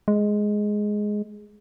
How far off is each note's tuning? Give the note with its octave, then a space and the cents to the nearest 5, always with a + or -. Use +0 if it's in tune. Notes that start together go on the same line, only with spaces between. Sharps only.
G#3 +5